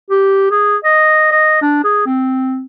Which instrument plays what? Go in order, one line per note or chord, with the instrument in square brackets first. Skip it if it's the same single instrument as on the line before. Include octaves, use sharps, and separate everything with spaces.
[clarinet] G4
G#4
D#5
D#5
D4
G#4
C4